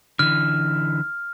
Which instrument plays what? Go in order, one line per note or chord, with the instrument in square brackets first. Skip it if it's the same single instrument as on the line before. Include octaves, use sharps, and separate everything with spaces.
[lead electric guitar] D3 E3 [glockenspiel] F6